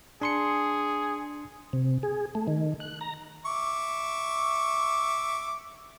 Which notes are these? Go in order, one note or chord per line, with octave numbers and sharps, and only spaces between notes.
D4 G#4 C6 C#7
C3
G#4
A3
D#3
F#6
A#5
E5 C#6 D6